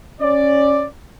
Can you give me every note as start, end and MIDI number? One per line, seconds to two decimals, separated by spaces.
0.21 0.86 61
0.21 0.86 74